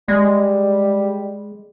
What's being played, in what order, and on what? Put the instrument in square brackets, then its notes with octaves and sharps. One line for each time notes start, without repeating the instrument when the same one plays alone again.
[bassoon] G3 [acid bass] G#3